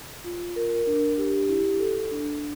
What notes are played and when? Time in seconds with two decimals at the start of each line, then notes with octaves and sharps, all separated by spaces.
0.24 F4
0.56 A#4
0.87 D4
1.18 G4
1.49 E4
1.79 A4
2.11 D4